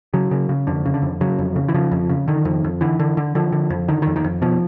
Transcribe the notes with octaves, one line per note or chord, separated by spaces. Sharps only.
C#3 F#3
C#3
C#3
F2 D3
C#3
D3
F2
C#3 F#3
F2
C#3
E3
C#3 F3
F2
C#3
D3 D#3
F2
F2
D3 E3
D3
D3
D3 F3
D3
F2
D3 D#3
D#3
F2
D#3
F2
B2 F3